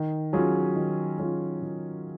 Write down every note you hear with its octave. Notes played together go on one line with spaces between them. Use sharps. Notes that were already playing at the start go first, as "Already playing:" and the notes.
Already playing: D#3
F#3 C#4 F4 G#4
D#3
F#3 C#4 F4 G#4
D#3